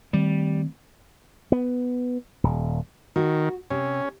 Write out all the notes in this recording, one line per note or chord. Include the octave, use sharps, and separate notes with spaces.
D#3 G3 A3 C4
B3
D#1
D#3 F#4
C3 C#4